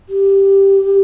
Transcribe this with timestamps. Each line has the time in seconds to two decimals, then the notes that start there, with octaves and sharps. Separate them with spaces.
0.09 G4